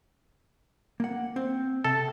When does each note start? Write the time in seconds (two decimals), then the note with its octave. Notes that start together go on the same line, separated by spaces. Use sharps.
1.00 A#3 F#5
1.36 C4
1.84 C3 A4